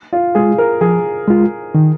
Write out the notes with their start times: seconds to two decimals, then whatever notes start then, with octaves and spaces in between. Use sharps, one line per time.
0.13 F4
0.35 G#3 F4 G#4
0.58 A#4
0.81 F3 G#4
1.28 G#3 F4
1.75 D#3